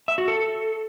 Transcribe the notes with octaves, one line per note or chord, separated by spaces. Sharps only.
E5
F#4
A4